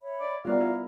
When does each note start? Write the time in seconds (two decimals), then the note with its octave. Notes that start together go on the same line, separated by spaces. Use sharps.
0.01 C#5 E5 B5
0.20 D5
0.45 G3 B3 F4 F#4 A#4 D5 E5 F5
0.61 E4